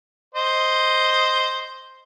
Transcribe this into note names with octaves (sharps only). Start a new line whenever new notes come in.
C5 D#5